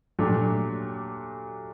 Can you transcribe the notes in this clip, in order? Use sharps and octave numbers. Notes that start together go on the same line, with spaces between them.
A#2 F#3 A3 D4 G4